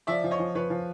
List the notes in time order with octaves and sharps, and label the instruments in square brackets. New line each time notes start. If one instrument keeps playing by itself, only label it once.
[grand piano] F3 [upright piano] D5 E5
[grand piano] F3
[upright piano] C#5 D#5
[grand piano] F3
[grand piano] F3 [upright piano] B4 C#5
[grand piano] F3